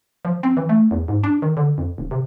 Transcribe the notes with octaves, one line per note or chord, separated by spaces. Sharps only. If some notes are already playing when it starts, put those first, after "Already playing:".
F3
C4
E3
A3
E2
G#2
D4
D#3
D3
F2
D#1
C3